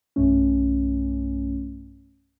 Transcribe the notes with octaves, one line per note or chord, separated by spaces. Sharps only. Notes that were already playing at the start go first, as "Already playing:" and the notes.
B1 G2 A3 C#4